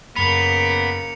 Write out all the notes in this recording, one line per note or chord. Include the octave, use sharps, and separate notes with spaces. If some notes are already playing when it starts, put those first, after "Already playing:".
F#2 C#3 A#3 B3 B5 C#7 F7